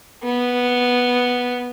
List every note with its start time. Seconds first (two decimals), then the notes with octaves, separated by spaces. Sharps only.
0.23 B3